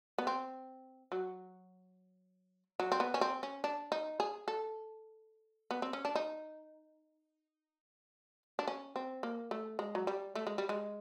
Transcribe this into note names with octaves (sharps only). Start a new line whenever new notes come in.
B3
C4
F#3
F#3
C4
B3
C#4
C4
C#4
D4
D#4
G#4
A4
B3
C4
C#4
D4
D#4
D4
C#4
C4
A#3
A3
G#3
F#3
G3
A3
G#3
G3
G#3